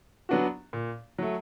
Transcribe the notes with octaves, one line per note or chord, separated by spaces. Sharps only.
F#3 B3 D4 F#4
A#2
F#3 A3